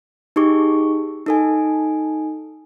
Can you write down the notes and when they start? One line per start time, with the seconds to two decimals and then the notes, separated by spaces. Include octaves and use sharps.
0.36 D#4 G4 G#4 C#6 D6
1.26 D#4 A4 G#5